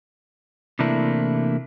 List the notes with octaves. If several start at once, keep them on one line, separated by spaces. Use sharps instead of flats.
C3 E3 A3 A#3 D4 E4